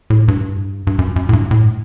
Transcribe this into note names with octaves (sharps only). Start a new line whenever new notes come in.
A2
G2
G2
F#2
F#2
A2
G2
A2